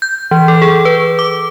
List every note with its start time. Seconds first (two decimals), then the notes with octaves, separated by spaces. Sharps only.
0.02 G6
0.31 E3
0.48 A4
0.62 G#4
0.85 B4
1.19 D6